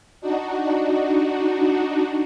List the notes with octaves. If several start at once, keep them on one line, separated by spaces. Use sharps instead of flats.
D4 D#4 F#4